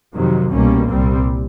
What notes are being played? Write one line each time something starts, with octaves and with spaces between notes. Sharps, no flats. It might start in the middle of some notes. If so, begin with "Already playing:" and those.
F2 C3 D#3 F#3
C2 B2 G3 A#3 C#4
C2 A#2 G3 C4